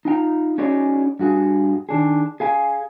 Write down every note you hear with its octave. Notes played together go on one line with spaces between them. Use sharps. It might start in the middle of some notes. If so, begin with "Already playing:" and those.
D#4 F4 G5 A#5
C#4 D#4 F#4 G#4 C#5 D5
G2 F#4 G#4
D#3 D4 G#4
G#4 F5 G#5